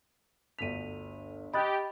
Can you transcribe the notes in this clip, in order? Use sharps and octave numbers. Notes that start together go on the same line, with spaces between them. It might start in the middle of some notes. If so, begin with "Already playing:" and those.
G1 D2 B6 D#7 F7
G4 D#5 B5 D#6 F#6 A6